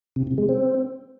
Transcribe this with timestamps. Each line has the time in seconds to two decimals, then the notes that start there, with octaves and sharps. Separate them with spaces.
0.16 C3
0.27 C3
0.38 G#3
0.49 C4